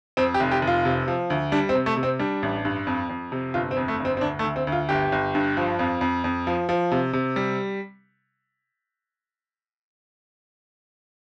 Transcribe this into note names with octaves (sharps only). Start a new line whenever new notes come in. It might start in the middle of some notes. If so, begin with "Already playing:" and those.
F2 C4
G4
F1
G4
F1
F4
C3
F3
D2
G3 D4
C4
C3
A3
C3
C4
G3 D4
A1
G2
F2
F2
C3
G1 F4
C4
F2
A3
G1
C4
C4
D2 D4
A3
D2
C4
D2
F4
G1 G4
G1
G2
F3
F2
F2
F2
F3
F3
C3
C3
G3